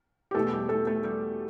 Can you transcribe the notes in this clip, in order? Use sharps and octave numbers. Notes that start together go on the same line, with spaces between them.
G4
E2 B2 A3 A4
G3 G4
A3 A4
A3 A4
G3 G4